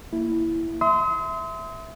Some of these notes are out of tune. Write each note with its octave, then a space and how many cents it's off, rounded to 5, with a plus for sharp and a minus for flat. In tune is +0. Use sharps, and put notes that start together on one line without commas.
A#3 +0 E4 +0
E5 +0 C6 -25 D#6 +45